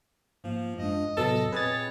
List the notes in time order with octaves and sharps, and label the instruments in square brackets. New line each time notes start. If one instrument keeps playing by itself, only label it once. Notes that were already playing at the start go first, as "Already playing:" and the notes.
[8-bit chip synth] G#2 A#3 [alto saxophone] F3
[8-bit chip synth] F#2 G#3 D4 [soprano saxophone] D#5
[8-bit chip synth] F2 A2 C3 [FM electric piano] F#3 B3 [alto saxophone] A4
[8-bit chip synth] A#2 C4 [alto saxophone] G#4 [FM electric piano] B4 D#5 A6 [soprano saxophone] C#5